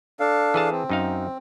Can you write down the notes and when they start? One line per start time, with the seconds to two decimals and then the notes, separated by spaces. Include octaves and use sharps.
0.20 D4 A4 F5
0.54 E3 G#4 A5
0.71 C4
0.89 F#2 D#4 F5